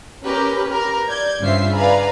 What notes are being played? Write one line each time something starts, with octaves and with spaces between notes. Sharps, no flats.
C#4 G4 A#4 B4
G4 A#4 B4
D5 G6 G#6
G2 C#3 F4 C5 E5 C7
B4 D5 F5 G#5 A#5 B5